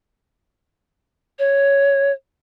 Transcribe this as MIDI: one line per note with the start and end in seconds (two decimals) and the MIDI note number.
1.39 2.12 73